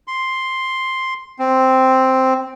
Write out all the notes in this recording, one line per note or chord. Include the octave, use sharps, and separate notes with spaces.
C6
C4